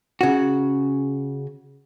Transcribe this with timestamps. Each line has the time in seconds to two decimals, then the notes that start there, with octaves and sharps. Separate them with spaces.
0.21 C#3 F#4